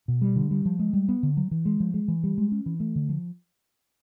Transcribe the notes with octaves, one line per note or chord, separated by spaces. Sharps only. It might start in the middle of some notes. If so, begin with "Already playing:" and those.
B2
G3
D3
G3
F3
G#3
G3
B3
D3
F#3
E3
G#3
F3
G#3
E3
G3
G#3
C#4
E3
A3
D3
F3